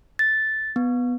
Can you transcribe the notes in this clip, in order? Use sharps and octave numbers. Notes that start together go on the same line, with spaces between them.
A6
B3